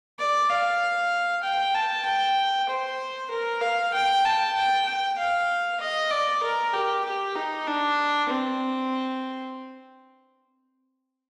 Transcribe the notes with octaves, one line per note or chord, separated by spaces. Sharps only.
D5
F5
G5
A5
G5
C5
A#4
F5
G5
A5
G5
G5
F5
D#5
D5
A#4
G4
G4
D#4
D4
C4